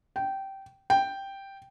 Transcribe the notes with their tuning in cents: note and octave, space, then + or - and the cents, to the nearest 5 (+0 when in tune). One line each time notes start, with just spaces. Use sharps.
G5 -15
G5 +0